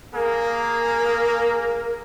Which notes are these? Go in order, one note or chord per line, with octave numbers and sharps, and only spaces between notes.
A#3 G#4 A#4